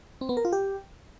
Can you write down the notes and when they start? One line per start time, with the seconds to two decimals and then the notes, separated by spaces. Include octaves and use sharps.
0.21 C4
0.29 B3
0.37 A#4
0.45 F4
0.52 G4